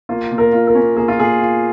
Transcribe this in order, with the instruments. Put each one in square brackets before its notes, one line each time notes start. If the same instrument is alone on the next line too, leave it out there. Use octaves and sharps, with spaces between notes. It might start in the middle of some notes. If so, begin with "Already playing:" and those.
[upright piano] A#3 [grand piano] F4
[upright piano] A#2
[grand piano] A#4
[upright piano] F4
[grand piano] A#4
[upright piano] C#4
[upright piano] A#3 [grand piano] G#4
[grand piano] F4
[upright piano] A#2 [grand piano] G#4
[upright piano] F4